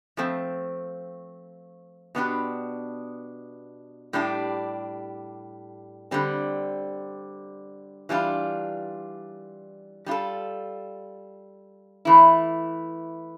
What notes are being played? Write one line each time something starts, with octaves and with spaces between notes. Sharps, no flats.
F3 A3 C4
B2 B3 D4 G4
A2 G3 D4 G4
D3 G3 C4
E3 G3 D4 F4
G3 D4 F4 A4
E3 A3 E4